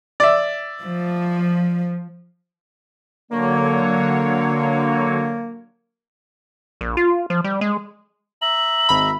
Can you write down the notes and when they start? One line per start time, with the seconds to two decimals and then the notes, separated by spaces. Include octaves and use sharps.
0.20 D5 E5
0.82 F3
3.30 D3 F#3 A#3 C#5
6.81 A#1
6.97 F4
7.30 F3
7.44 G3
7.61 G#3
8.42 E5 A#5 F#7
8.89 G#1 B5